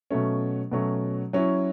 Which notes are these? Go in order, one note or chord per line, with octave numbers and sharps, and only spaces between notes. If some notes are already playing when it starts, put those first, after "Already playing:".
B2 F#3 A3 C#4
B2 F#3 A3 C#4
F#3 C#4 E4